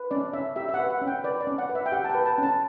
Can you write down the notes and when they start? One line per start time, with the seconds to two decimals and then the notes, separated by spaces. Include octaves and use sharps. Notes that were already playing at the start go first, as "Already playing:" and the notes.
Already playing: B4
0.11 C#4 D5
0.33 C#4 E5
0.56 G4 E5
0.69 E5
0.74 F#5
0.80 B4
0.90 F#5
1.01 C#4
1.07 G5
1.24 B4 D5
1.41 D5
1.47 C#4
1.58 F#5
1.69 B4
1.75 E5
1.86 G5
1.92 G4 F#5
2.04 A5
2.10 B4 G5
2.26 A5
2.38 C#4 A5